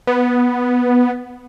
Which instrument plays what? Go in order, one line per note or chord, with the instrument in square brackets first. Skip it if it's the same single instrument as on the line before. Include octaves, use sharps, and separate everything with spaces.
[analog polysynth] B3